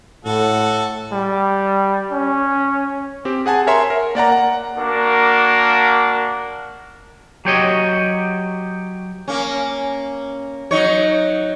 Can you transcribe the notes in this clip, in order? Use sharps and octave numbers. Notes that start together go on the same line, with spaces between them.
A2 F#4 A4
G3
C#4
C4 G4
G#4 F#5 G#5 A5
A#4 C#5 E5 G#5 A#5 C6
A#4
A#3 D5 F#5 A#5
F#5
A#3 D4 F#4 A#4
F#3 G4 C#5 D#5
A#3 C#4
F#3 D#4 C#5